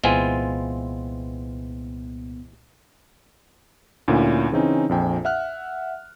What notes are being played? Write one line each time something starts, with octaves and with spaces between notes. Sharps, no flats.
C2 A#2 E3 G#3 B3 C4 F4 G#5
D2 A#2 C#4 E4
C#3 E3 C4 C#4 D#4
A#1 F2 G5 G#5
E5 F#5 F6 F#6